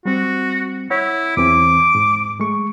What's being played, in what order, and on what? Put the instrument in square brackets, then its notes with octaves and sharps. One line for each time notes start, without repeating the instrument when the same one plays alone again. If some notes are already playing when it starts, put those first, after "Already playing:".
[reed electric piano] G3 C4 [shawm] F#4
[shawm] E4 [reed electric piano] C#5 F#5
[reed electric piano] E2 E3 C4 [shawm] D6
[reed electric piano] G#2
G#3 A3 C#6